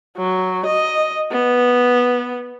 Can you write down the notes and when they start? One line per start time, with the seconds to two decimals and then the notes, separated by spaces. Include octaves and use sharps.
0.18 F#3
0.66 D#5
1.31 B3